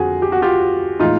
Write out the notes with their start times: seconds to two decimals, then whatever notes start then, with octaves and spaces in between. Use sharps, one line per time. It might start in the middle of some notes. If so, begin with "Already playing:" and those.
Already playing: F2 D3 G3 F4 F#4 G#4
0.22 G4
0.32 F#4
0.42 F4 G4
1.00 A2 E3 G#3 D#4 F4